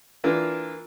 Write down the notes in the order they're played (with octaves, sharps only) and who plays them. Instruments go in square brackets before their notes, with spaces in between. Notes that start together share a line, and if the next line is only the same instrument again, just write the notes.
[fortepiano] E3 A#3 D4 F4